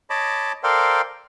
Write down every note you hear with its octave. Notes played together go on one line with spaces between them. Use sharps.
C#5 D#5 A5 B5 D6
A4 A#4 C5 D5 F5 G5